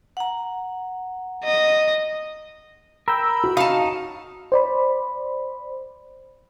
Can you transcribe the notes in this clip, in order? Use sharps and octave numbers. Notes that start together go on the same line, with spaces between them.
F#5 A#5
D#5
A#4 G5 A#5 B5 E6
F#4
D#4 C#5 F5 A5
C5 D5 B5